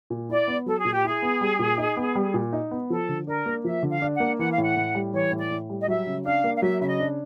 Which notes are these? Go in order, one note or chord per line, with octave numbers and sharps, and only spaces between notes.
A#2
E4 D5
B3
F#3 A4
G#4
A#2
G4
E4 G#4
B3
G3
A#2
D#4
B3
G3
A#2
D#4
B3
F3 A4
D3
D4 A#4
A#3
F3 E5
D3
F5
D4
F#5
A#3
E3 F#5
F5
A2 F#5
A2
G3
E3 C#5
A2
D5
A2
G3
D#5
F#3 E5
C#3
D4 F5
A#3
F5
F#3 E5
C#3 E5
D#5
D4